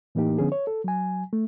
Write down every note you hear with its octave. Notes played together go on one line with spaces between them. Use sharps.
A2 E3 A#3 D#4 G4
D3 F3 B3 C#4 D4 G#4
C#5
A4
F#3 G#5
A3